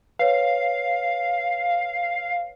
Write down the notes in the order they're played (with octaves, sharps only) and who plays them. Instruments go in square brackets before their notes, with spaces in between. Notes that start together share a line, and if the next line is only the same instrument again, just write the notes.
[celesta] B4 C#5 [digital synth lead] F5